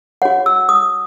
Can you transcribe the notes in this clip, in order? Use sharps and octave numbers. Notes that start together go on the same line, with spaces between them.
F#4 C#5 F#5
E6
D#6